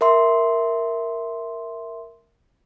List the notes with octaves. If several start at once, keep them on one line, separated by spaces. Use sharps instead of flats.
A#4 E5 C6